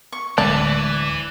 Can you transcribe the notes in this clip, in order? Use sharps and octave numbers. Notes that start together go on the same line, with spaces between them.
C#6
D1 D2 E3 G#3 D4 D5